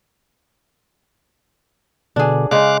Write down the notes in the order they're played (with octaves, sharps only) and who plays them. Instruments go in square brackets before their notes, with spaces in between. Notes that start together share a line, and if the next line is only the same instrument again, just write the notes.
[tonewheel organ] B2 D3 [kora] D4 G#4
[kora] C#3 G#3 [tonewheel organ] F5 D6 F#6